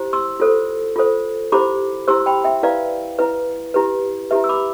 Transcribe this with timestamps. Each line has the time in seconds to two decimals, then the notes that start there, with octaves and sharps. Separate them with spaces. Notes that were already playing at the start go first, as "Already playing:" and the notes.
Already playing: E4 G4 C5
0.13 C6 E6
0.40 F4 A4 C5
0.96 F4 A4 C5
1.52 E4 G4 C5 B5 D6
2.07 E4 G4 C5 C6 E6
2.26 G5 B5
2.44 E5 G5
2.63 E4 B4 D5 F5
3.19 E4 B4
3.74 E4 G4 B4
4.31 E4 G4 B4 E5
4.44 E6
4.49 B5 D6